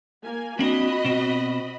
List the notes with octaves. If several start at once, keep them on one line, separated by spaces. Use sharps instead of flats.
A#3 G#5
A#3 C4 D4 F#4 D#5 B5
B2 C4